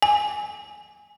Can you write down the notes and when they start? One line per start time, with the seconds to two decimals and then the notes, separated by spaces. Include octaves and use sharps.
0.02 G#5